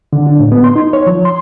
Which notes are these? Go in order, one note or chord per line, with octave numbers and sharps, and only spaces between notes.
D3
D4
A2
B3
C6
D#4
C#5
F3
C6